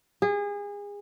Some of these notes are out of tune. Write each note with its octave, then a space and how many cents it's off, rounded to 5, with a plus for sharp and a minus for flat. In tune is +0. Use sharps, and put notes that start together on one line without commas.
G#4 -30